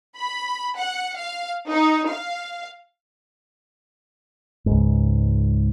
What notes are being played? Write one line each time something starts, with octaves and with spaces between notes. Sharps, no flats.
B5
F#5
F5
D#4
F5
C#2 G#2